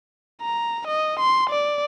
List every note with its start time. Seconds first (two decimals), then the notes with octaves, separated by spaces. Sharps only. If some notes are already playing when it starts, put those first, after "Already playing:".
0.42 A#5
0.87 D#5
1.19 C6
1.50 D5